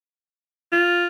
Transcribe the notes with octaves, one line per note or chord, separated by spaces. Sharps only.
F4